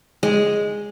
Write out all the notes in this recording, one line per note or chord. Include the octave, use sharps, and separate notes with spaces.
G#3